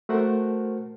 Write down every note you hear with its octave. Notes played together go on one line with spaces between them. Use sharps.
A3 F#4 A#4 C5 F#5